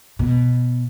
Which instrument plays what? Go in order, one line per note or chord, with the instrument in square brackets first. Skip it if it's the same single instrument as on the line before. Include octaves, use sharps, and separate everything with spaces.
[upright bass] B2